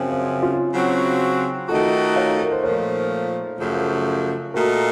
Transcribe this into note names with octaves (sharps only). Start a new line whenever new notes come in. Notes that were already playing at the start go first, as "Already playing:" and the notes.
Already playing: F#2 C#3 F3 C4
C#4
C#4 F4
C#3 F#3 C4 F#4
D#3 A3 D#4 F4 F#4 A4
C#5 F5
A4
A#4
C5
A#2 F3 A3 A#4 C#5
F#2 C#3 F3 A3
A#2 A3 D#4 F#4 A#4